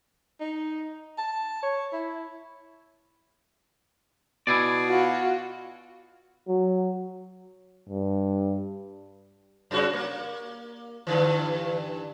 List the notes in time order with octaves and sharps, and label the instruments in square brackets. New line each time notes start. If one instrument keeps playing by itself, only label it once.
[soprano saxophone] D#4
A5
C#5
E4
[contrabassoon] B2 [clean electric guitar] E4 G#4 D5
[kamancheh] F4 F#4
[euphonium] F#3
[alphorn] G2
[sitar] F#2 C#3 F#4
A#3
G2 D3 E3